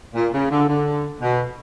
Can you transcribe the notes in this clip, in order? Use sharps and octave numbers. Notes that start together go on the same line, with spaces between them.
A#2
C#3
D3
D3
B2